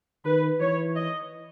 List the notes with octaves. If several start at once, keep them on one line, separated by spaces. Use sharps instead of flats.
D#3 B4
E3 C#5
D#5